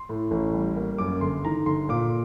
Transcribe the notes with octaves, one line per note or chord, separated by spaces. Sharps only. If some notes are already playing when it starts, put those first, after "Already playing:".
Already playing: C6
A2
A1
G3
A#3
F#2 D6
G1 C6
D#3 A#5
G1 C6
A#2 D6